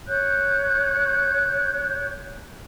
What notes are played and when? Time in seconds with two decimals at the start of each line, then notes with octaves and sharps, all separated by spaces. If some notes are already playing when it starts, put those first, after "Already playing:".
0.07 C#5 F#6 G6